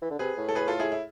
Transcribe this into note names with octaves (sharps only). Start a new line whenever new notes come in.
E3
D3
C3 G#4 B4
A2
A4
G#4 B4
F4 A4
E4 G#4
E4